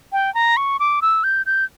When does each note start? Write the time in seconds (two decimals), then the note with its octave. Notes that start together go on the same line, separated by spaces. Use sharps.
0.12 G5
0.35 A#5
0.57 C#6
0.80 D6
1.02 E6
1.24 G6
1.46 G6